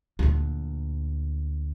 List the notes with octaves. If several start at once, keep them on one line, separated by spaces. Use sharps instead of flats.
D2 A#2